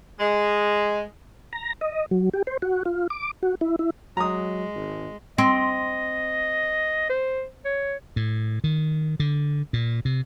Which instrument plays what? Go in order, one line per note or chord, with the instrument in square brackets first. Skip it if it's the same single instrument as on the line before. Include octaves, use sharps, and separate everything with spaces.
[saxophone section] G#3
[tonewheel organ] A#5
D#5
F#3
G4
C5
F#4
F4
D6
F#4
E4
E4
[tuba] F#3 [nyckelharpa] G#3 [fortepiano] A#5 D#6
[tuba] G#1
[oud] C4 [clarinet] D#5
[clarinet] C5
C#5
[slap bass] A2
D#3
D3
A#2
C3